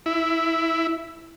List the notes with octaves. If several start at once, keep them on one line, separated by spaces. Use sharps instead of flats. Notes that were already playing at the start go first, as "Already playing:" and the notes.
E4